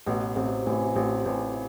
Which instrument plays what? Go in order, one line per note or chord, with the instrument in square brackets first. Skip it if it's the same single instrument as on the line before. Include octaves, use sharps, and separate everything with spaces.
[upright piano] A1 [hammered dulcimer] B2
[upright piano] A1 [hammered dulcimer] C3
[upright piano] A1 [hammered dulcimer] E3
[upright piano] A1 [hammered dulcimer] F3
[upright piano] A1 [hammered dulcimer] E3